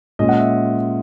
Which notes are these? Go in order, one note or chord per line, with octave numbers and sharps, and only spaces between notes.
A#2 G#3 C#4 D#5
F#5
E5